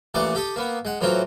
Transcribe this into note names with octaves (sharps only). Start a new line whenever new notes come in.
A1 A#2 E3 D5 C#6 D#6
G4 A4 D#6
A#3 B3
G#3 F#5
A2 E3 F#3 C4 F4